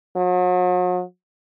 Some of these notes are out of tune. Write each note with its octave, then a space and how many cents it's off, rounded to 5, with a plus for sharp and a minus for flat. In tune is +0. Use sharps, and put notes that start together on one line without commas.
F#3 -40